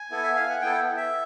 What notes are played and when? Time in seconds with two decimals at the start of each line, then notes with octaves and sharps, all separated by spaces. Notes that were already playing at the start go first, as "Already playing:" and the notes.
Already playing: G#5
0.11 B3 E4 A4
0.23 E5
0.36 F5
0.49 F#5
0.62 B3 E4 A4 G5
0.97 E5